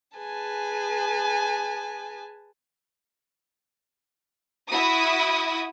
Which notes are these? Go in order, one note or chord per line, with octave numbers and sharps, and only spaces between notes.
G#4 B4 G#5 A5
E4 F#4 D#6